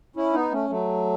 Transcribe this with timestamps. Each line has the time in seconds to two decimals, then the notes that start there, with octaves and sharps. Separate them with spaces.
0.16 C#4 E4
0.34 B3 D#4
0.52 A3 C#4
0.70 F#3 A3